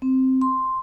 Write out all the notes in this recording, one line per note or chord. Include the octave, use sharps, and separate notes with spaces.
C4
C6